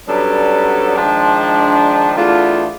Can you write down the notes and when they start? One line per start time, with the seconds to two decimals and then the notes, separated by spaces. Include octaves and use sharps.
0.07 F#3 G3 B3 C#4 D4 A4
0.96 D#3 F3 G#3 D4
2.16 E2 A3 D4 F4